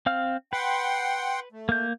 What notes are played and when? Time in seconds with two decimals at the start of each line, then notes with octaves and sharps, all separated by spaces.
0.06 C4 F5 F6
0.53 B4 F#5 G5 C6
1.52 A3
1.69 A#3 G6